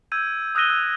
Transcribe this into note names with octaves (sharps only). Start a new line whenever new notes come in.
E6 G6 G#6 D#7
D#6 E6 F#6 A#6 D#7 G7
E6